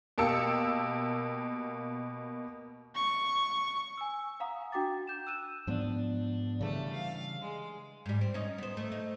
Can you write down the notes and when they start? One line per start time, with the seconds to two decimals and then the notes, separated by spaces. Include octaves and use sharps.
0.18 B2 A#3 G4 A5 E6 C#7
2.95 C#6
3.97 G#5 E6
4.40 F5 F#5 A#5 D#6
4.72 D4 F#4 G5 D6 A6
5.07 G6 E7
5.27 E6 F#6 D#7 E7
5.67 G#2 F3 B3 D4
6.61 C#3 E3 G3 A3 A5
6.92 F5
7.41 G#3
8.06 G#2 G3
8.21 C4
8.34 C#4 D#4
8.58 B3 C5
8.77 A3
8.92 D#4